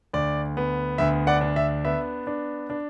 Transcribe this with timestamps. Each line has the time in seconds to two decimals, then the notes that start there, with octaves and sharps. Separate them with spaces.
0.13 D2 D5
0.57 B3
0.98 D2 E5
1.27 D5 F#5
1.41 D4
1.56 E5
1.85 B3 E5
2.27 D4
2.70 D4